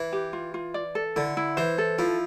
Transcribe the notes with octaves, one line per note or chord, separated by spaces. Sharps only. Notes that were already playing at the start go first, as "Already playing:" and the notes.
Already playing: E3 B4
G4
F4
F4
D5
A4
D3 E4
E4
E3 C5
A4
F3 E4